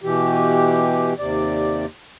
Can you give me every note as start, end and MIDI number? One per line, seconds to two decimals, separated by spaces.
0.04 1.13 47
0.04 1.13 52
0.04 1.13 67
1.19 1.85 39
1.19 1.85 48
1.19 1.85 74